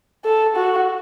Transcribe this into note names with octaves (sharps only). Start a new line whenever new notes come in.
A4
F#4